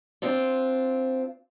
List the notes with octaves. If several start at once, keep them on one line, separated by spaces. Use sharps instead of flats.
C4 D4 F4